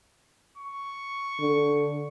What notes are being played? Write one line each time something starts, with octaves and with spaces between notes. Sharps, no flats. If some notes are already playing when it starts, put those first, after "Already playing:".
C#6
D3